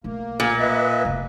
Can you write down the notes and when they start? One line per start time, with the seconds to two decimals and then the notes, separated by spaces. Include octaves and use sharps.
0.04 B1 A3 A#3
0.40 A#2
0.58 B4 D#5 E5
1.05 F1 C3